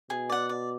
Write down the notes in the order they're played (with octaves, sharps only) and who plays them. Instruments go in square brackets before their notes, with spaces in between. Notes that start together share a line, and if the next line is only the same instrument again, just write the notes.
[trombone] B2 [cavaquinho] G#4
[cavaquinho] D5 F#5
D5